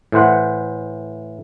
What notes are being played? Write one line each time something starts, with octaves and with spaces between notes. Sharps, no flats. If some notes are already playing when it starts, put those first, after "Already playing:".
A2 E3 C5 F#5